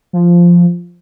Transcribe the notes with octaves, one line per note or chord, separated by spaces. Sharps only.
F3